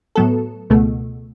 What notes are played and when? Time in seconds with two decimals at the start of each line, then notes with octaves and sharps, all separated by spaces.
0.15 A2 F#3 B3 A4
0.70 C#2 B2 A3